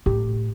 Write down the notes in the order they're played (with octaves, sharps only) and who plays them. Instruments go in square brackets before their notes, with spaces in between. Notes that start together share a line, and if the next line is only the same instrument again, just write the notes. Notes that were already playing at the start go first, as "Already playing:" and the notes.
[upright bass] A2 [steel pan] G4